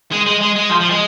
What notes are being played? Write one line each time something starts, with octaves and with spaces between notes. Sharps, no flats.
G#3
G#3
G#3
G#3
F3
F3
G#3